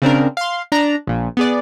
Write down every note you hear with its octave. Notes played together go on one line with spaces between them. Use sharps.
C#3 C4 D4 A#4
F5 C6
D4 A#5
A#1 A#2
B3 G#4 D5